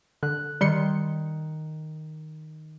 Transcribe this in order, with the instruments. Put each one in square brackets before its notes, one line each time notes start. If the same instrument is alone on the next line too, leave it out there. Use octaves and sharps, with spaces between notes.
[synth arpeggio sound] D3 [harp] F#6
[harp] D#3 [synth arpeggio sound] G3 C6 C#7